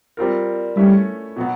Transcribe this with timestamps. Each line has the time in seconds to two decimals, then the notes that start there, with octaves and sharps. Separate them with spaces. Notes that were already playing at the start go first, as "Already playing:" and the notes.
0.17 G3 C4 F4 A#4
0.77 G3 A3 C#4 E4
1.36 B2 F#3 B3